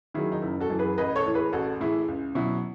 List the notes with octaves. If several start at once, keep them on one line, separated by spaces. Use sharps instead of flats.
D#3 F#3 E4 G#4
D#4
F#1 E4
F#4 A4
F#2 E3
G#4 B4
A1 B4 D#5
A4 C#5
A2 E3
G#4 B4
A1 F#4 A4
A2 E3 E4 G#4
C#2
B2 F#3 E4